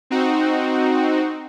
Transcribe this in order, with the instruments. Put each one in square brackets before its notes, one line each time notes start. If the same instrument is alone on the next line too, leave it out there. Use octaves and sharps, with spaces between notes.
[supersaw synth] C4 D#4 F#4